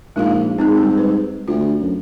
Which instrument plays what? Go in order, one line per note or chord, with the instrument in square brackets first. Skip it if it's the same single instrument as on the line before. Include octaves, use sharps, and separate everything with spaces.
[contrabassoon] A#1 [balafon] G#3 D#4 F5
[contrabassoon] G#2 [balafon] C4 D#4 G#4
[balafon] G3 G4
B4
[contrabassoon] D2 [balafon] F4
[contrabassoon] F#2